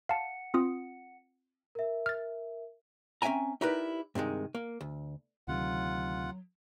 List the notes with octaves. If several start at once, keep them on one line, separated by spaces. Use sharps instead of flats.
F5 F#5 A5 C#7
C4 F4 D#6
A#4 E5
F6 A6
C4 C#4 E5 G5 G#5 A#5
D#4 E4 G4 A#4 B4 D5
G2 C3 D#3 G#3
A#3
D2
D2 C3 D#3 F#3 F4 F#5